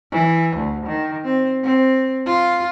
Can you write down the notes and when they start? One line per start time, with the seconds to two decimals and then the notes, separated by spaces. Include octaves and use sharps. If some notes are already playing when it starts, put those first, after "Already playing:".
0.12 E3
0.56 D2
0.86 D#3
1.24 C4
1.63 C4
2.26 F4